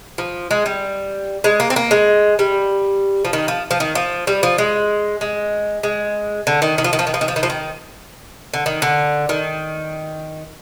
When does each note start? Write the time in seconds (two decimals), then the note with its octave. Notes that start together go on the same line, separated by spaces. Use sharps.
0.18 F3
0.51 G#3
0.66 G3
1.44 G#3
1.60 A#3
1.70 C4
1.76 A#3
1.91 G#3
2.39 G3
3.25 F3
3.33 D#3
3.48 F3
3.71 F3
3.80 D#3
3.95 F3
4.27 G3
4.43 F3
4.58 G#3
5.21 G#3
5.83 G#3
6.47 D3
6.62 D#3
6.78 D#3
6.84 F3
6.93 D#3
6.99 F3
7.07 D#3
7.14 F3
7.21 D#3
7.28 F3
7.36 D#3
7.43 F3
7.50 D#3
8.53 D3
8.66 D#3
8.82 D3
9.29 D#3